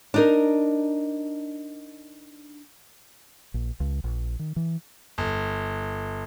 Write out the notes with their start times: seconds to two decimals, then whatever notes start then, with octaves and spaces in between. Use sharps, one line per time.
0.14 D4 D#4 A#4
3.54 A#1
3.80 C#2
4.04 A#1
4.39 D#3
4.56 E3
5.18 G1